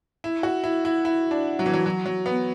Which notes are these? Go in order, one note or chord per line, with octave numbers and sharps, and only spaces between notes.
E4
F#4
E4
E4
E4
D4
F#3
E3
F#3
F#3
F#3
B3